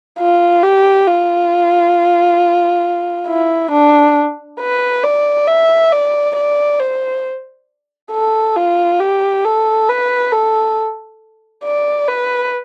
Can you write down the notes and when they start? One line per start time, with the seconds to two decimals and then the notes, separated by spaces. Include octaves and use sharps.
0.19 F4
0.62 G4
1.07 F4
3.27 E4
3.71 D4
4.60 B4
5.04 D5
5.47 E5
5.92 D5
6.36 D5
6.79 C5
8.12 A4
8.56 F4
9.00 G4
9.45 A4
9.89 B4
10.32 A4
11.64 D5
12.08 B4